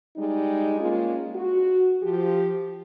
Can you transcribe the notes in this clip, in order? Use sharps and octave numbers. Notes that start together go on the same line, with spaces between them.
G3 G#3 D#4
G#3 A#3 C#4 F4
F#4
F3 G4